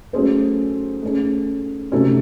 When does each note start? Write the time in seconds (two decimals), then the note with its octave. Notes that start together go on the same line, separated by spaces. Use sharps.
0.13 F#3 A3 C#4 G#4 C5
1.03 A3 C#4 G#4
1.92 C3 F#3 A3 C#4